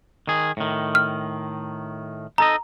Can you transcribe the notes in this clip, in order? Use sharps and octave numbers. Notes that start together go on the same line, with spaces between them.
D#3 G#4
A2 D#3
F6
D#4 A4 D#5 A#5